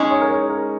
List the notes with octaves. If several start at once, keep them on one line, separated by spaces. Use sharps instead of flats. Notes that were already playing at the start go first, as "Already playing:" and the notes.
Already playing: G#3 C#4 D#4 G#4
C#5
A#4
C#5
A#4